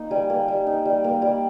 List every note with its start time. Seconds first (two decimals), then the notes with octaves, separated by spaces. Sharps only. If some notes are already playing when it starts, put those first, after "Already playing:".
Already playing: A#3 D#4
0.11 G3 G#5
0.30 A#3
0.48 G3
0.67 D#4
0.85 G3
1.04 A#3
1.22 G3